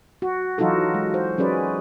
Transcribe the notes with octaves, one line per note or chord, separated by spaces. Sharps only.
F#4
E3 F#3 D#4 F4 F#4 A4
G#3
C5
F#3 C#4 G#4 B4 D5